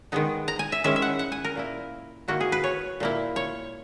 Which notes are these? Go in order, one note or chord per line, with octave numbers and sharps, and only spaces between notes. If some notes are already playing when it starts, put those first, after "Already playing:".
D#3 G#3 B3 D#4
A#5
G#5
E5
D#3 G#3 C#4 E4 E5
E5
F#5
F#5
G#5
A#4
A#2 A#3 E4
D#3 A#3 E4 F#4
G#4
B4
C#5
A#2 A#3 E4
C#5